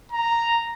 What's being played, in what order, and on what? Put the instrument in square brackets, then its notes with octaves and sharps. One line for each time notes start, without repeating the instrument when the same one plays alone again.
[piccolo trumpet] A#5